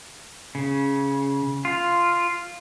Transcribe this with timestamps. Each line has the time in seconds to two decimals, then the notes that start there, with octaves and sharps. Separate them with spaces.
0.55 C#3
1.65 F4